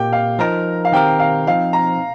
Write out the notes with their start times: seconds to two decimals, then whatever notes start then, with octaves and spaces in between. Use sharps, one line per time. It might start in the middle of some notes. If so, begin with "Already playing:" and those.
Already playing: A#2 A#3 G4 G5
0.13 F5
0.39 F3 D#4 A#4 A#5
0.85 F5
0.93 D#3 C4 G4 A#4 G5
1.19 F5
1.47 F3 C4 D#4 F5
1.73 A#5